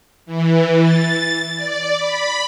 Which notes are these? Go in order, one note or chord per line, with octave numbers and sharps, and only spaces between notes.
E3
A6
D5
B5